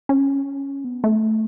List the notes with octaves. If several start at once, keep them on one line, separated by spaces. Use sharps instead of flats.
C#4
B3
A3